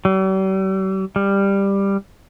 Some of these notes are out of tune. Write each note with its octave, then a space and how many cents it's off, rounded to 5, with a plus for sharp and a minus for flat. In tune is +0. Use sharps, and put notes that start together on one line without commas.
G3 -45
G3 +10